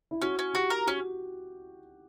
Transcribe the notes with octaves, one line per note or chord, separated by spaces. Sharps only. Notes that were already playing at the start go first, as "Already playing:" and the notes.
E4
C#4 F#4
C#4
F#4 G4
A#4
C#4 F#4